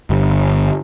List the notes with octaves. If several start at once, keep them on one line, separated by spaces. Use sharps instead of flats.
G1